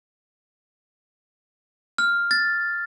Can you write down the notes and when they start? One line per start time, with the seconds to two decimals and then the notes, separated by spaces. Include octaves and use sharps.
1.98 F6
2.31 A6